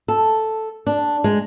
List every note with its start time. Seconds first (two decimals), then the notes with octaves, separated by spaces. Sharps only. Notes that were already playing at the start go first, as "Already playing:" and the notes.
0.08 A4
0.87 D4
1.24 G#3